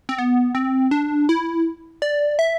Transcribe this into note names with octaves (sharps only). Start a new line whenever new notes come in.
C4
B3
C4
D4
E4
D5
E5